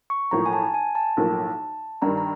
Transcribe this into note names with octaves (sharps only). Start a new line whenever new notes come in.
C#6
B1 A2 F3 A#3 A#5
G#5
A5
G#5
A5
B1 A2 F3 A#3
G2 D#3 G3 A#5
A#5